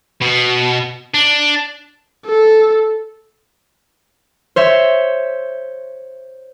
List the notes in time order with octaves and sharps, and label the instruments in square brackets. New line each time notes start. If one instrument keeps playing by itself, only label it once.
[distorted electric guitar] B2
D4
[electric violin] A4
[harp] C5 C#5 E5